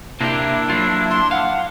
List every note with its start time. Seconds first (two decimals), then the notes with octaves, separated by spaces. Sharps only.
0.21 C3 A#3 D4 E4 G4
0.69 F#3 F4
1.11 C6
1.31 F5 F#5